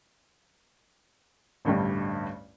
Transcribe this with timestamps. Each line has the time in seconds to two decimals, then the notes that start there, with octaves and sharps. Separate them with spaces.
1.65 A1 D2 G2 G3